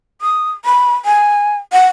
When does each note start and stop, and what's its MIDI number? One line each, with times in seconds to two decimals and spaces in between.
0.21 0.50 87
0.65 0.94 83
1.05 1.56 80
1.73 1.86 78